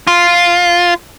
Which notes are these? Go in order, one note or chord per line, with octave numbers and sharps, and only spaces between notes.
F4